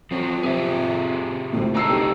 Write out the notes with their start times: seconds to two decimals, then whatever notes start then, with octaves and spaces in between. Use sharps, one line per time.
0.11 F2 F3 F#3
0.43 C3 C4 G4 G#4 E5
1.53 G#1 F2 A2
1.75 G#1 A3 D4 D#4 A#5 E6 C7
1.89 B1 G4